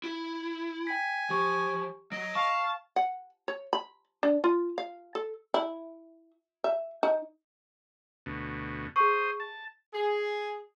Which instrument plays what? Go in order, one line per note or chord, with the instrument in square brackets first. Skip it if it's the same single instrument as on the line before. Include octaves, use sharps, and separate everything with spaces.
[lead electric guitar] E4
[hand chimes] G5 B6 [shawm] G#5
[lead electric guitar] F3 [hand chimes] G4 C#6
[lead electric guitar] F#3 [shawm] D#5 [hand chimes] D7
[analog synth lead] F5 [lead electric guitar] A5 [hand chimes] C#6
[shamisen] F#5
C#5
B5
D4
F4
F5
A4
E4
E5
D#4
[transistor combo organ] D2 B2
[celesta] G#4 C#6 [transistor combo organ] C5 D#6
[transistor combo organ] A5
[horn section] G#4